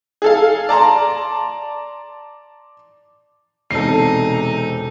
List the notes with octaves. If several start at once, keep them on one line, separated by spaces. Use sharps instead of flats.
G#4 A4 F5
D5 A5 A#5 C6
E1 C3 D#4 A4 C7